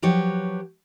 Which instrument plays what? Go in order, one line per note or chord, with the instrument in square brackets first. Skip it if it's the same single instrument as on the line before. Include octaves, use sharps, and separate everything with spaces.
[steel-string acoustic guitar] F3 F#3 G4 B4 C#5